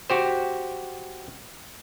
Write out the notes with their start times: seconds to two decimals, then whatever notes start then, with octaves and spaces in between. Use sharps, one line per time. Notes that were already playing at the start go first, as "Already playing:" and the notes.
0.10 F#4 G4 C5